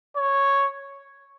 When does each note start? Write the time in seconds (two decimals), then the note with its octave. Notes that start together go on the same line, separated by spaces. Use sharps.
0.16 C#5